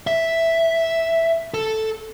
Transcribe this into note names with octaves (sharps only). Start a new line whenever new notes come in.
E5
A4